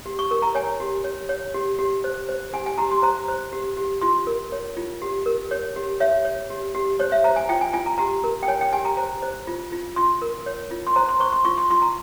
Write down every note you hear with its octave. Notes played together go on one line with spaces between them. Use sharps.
G4
C#6
A#4 C#6
A#5
C#5 G#5
G4
C#5
C#5
G4
G4
C5
C5
G4 G#5
G#5
G4 A#5
C6
C5 A#5
C5
G4
G4
F4 C6
A#4
C#5
F4
G4
A#4
C#5
G4
C#5 E5
C#5
G4
G4
C5 C#5
E5
C5 A#5
G#5
F4 G5
G#5
F4 G#5
A#5
G4 A#5
A#4
G5
C#5 G#5
G5
G4 G#5
A#5
C5 A#5
C5
F4
F4
F4 C6
A#4
C#5
F4
C6
C5 A#5
C6
C5 C#6
C6
F4 C#6
C6
F4 C6
A#5